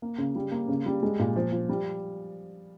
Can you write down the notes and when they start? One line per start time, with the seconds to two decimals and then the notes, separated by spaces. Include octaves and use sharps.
0.02 A#3
0.18 C#3
0.36 G3
0.52 A#3
0.68 C#3
0.86 G3
1.03 G#3
1.19 A#2
1.36 F3
1.52 F3
1.69 G3